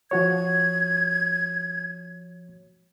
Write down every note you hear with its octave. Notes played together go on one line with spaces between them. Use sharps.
F3 F#4 C#5 G#6